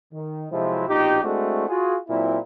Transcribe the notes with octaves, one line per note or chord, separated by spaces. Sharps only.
D#3
C3 F3 F#3 G#3 C4 E4
A#1 B2 D#4 F4 G4
G#3 A3 C4 D4 E4 F#4
F4 F#4 G#4
A#2 F#3 C4 E4